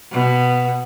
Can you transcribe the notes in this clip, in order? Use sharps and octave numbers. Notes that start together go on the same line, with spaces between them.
B2